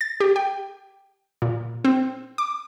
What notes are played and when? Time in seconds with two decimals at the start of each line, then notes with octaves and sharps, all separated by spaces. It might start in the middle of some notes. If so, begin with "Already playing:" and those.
0.01 A6
0.20 G4
0.36 G5
1.42 A#2
1.85 C4
2.38 D6